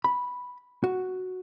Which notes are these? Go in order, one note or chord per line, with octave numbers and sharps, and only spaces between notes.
B5
F#4